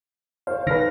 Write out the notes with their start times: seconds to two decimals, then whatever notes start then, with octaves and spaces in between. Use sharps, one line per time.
0.47 C5 C#5 F5
0.67 D#3 B4 F6 A#6